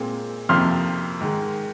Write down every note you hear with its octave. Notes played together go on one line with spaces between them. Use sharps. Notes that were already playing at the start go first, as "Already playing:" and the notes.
Already playing: A#2 G#3 C4
F2 C3 F3 A#3 C6 F6
G#2 D#3 G#3